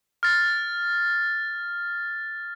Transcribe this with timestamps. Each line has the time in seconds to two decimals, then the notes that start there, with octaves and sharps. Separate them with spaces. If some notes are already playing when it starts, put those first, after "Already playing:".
0.23 F6 A6